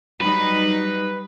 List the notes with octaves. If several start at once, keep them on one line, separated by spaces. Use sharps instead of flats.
F#3 G3 D#4 B4